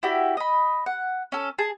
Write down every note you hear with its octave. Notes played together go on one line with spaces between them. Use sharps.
E4 F#4 G4 D5
D#5 B5
F#5
C#4 A4
G#4 A5